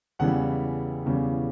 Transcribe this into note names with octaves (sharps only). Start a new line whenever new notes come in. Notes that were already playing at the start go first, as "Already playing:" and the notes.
E2 C#3 E3 G3 F#5
E2 C#3 E3 G3